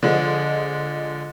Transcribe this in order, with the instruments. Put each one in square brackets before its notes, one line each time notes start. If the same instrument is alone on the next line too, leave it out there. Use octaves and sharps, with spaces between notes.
[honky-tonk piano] D3 F3 G#3